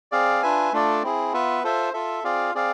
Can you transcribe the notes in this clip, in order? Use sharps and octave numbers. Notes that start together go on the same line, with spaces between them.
C4 G#4 D5 F5
D4 F4 B4 E5 G#5
A3 D4 F4 A4 D5
C4 E4 G#4
B3 F4 B4 E5
F4 A4 C5 E5
F4 A4 E5
C4 F4 G#4 D5 F5
C4 G#4 D5 F5